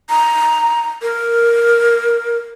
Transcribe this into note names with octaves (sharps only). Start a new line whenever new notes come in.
A#5
A#4